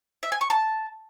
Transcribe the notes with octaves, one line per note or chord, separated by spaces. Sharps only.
E5
G#5
C#6
A5